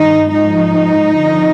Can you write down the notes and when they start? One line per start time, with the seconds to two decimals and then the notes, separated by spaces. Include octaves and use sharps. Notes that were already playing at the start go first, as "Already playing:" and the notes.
Already playing: G2 D#3 D#4
0.31 G#2 F3 D#4
1.16 F2 D3 F3